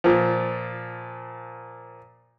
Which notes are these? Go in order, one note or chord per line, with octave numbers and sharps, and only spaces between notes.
A#2 F3